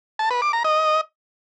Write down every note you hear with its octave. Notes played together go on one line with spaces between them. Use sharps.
A5
B4
D6
A#5
D#5